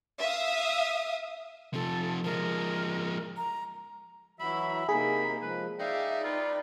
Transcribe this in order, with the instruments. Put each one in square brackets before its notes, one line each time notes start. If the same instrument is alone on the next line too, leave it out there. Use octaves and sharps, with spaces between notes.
[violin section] E5 F5 D#6
[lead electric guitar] C3 F3 [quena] A4
[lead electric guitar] F3 G#3 [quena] A#4
[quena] A#5
[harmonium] E3 F#3 F#4 [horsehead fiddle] E4 B5 [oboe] E5
[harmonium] C3 D#4 [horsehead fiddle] A#3 [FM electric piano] G#4 [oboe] B5
[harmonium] F3 G#3 [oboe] B4
[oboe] D#4 [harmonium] D5 G5 [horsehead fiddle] E5 F5
[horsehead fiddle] D#4 B4 [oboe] F4